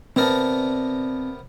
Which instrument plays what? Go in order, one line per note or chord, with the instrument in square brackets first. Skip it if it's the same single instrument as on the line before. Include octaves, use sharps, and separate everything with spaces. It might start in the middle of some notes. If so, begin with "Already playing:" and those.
[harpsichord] C3 B3 A#4 [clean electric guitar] C4 D5 A5